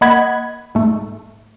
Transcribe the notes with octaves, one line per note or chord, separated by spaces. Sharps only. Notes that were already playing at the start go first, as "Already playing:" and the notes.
A#3 D#5 F#5 B5 G#6
G#2 A3